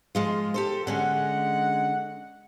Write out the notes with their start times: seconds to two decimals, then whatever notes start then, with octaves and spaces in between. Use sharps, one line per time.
0.15 F3 G#3 F4
0.54 G4 A4 C5
0.87 D3 G#3 C#4 F#4 F#5